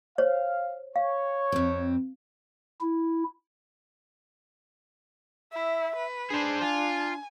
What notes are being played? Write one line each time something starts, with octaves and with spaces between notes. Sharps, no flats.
C5 C#5 F5
C#5 F5
F2 C4
E4
E4 E5
B4
D4 G#4 C5
F4 G#5